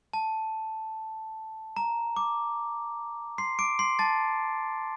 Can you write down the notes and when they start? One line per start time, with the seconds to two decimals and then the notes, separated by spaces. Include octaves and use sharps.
0.13 A5
1.76 A#5
2.17 D6
3.38 C6 C7
3.59 D6 D7
3.79 C6 C7
3.99 A5 A6